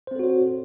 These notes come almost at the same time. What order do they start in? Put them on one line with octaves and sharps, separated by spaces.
C5 C4 A4 F#4 C#5